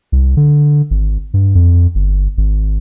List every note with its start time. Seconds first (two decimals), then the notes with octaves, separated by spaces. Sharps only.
0.12 C2
0.37 D3
0.91 G#1
1.34 G2
1.55 F2
1.95 G1
2.37 G#1